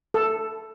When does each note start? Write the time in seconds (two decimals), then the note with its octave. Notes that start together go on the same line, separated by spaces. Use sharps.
0.14 A4